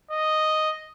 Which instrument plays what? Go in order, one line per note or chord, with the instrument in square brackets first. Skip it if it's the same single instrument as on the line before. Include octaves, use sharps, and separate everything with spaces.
[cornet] D#5